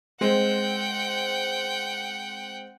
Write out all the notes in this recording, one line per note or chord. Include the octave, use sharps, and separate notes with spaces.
G#3 C4 F#5 G5